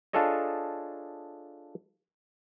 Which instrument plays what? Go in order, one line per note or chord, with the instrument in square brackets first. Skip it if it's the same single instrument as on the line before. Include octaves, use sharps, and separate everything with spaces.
[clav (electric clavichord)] D4 F4 G#4 A4 C#5 D#5